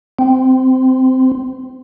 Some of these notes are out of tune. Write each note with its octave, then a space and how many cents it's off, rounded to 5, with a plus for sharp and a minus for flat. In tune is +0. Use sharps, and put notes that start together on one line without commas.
C4 -15